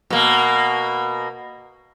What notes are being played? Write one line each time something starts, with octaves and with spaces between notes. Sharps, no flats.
B2 A#3